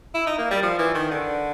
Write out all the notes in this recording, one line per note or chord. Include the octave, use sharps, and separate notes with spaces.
E4
D#4
A#3
G3
F3
E3
D#3
D3